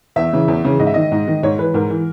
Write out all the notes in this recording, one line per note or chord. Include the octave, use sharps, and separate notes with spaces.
E2 E5
C#3 E3
E2
C#3 E3
G#2 D#5
E5
D#3 D#5
G#2
D#3
G#2 C#5
E3 B4
G#2 A#4
E3